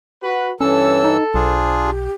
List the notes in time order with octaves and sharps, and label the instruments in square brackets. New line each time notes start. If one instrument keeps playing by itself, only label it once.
[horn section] F#4 B4
[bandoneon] G2 E3 E6 [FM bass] C#4 [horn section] A4 [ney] C#5
[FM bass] D#4
[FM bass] B1 [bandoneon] D4 F4 G#4 [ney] C5
[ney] G4